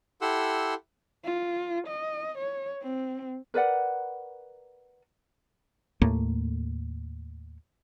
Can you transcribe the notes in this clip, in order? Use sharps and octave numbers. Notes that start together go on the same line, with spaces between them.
E4 G4 A4 F#5 C6 E6
F4
D#5
C#5
C4
A#4 B4 D5 F#5
D#2 A2 A3 A#3